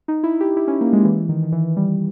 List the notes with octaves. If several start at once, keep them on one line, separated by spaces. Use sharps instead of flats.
D#4
E4
G4
E4
C#4
A#3
G#3
E3
D#3
D#3
E3
G3